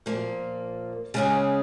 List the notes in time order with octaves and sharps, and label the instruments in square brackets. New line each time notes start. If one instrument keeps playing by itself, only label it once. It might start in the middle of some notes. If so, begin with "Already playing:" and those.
[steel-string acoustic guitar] A#2 F3 A#3
C#3 G#3 C#4 G#4